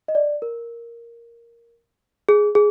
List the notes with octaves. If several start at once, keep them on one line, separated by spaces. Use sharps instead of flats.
D#5
D5
A#4
G#4
G#4